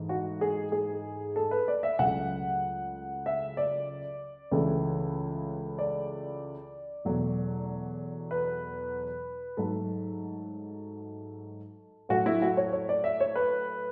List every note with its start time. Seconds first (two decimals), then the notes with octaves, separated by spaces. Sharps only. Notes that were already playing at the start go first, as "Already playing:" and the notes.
Already playing: G#2 E3 A3
0.09 F#4
0.41 G#4
0.72 G#4
1.36 A4
1.51 B4
1.68 D5
1.83 E5
1.99 C#2 C#3 F#3 A3 F#5
3.26 E5
3.57 D5
4.52 C#2 C#3 E3 A3
5.79 D5
7.05 E2 B2 F#3 A3
8.31 B4
9.57 G#2 F#3 A3 A4
12.09 A2 F#3 A3 F#4
12.26 E4
12.42 F#4
12.57 C#5
12.73 C#5
12.89 D5
13.04 E5
13.20 C#5
13.35 B4